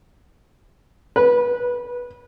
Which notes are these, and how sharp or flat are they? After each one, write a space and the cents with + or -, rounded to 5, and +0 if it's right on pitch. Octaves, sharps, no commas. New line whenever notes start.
B4 -20